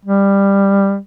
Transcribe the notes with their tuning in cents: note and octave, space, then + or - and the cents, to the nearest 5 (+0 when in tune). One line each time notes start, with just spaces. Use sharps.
G3 +15